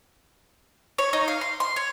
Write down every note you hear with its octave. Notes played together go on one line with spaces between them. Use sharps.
C#5
D#4
F5
C6
C6
C#5